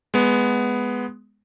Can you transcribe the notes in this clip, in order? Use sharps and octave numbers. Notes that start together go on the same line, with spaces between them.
G#3 B3